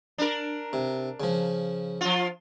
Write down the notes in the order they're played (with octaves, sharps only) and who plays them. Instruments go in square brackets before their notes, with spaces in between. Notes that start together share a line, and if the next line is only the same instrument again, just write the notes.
[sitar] D4 A#4
[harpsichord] C3
C#3 F3
[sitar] F3 F4